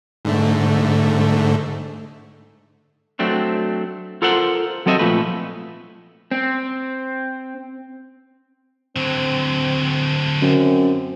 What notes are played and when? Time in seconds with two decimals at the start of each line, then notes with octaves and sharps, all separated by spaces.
0.25 G#2 D3 A3
3.19 F#3 A3 C4 D4
4.22 F4 A4 A#4 C5 F#5
4.86 F#3 C4 A4 D#5 E5
4.99 A#2 F3 A3 B4
6.31 C4
8.96 D3 F#3 C4
10.42 F#2 C4